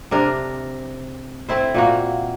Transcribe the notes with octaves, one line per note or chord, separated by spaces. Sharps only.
C3 D4 A#4 C5
A3 C4 E4 C5
A#2 A#3 F#4